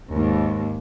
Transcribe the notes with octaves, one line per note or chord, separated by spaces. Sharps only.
D#2 G#2